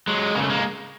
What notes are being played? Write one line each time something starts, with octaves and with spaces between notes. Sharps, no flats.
F#3 G#3
C#3 A#3
A3
G#3 A#3